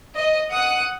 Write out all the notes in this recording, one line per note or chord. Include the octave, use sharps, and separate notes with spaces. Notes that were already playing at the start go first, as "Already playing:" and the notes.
D#5
F#5 D#6 F#6